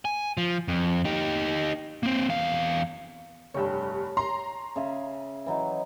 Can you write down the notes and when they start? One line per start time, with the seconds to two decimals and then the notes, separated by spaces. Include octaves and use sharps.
0.05 G#5
0.37 F3
0.68 F2
1.05 D#4 G4
2.03 A#3 C4
2.29 E2 F5
3.54 F1 G2 C#5 G5 A5
4.17 A#5 C6
4.76 C#3 E5 G#5
5.46 E3 F#3 D#4